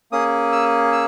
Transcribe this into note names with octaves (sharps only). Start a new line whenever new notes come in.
A#3 C#4 G#4 D#6
E6
E6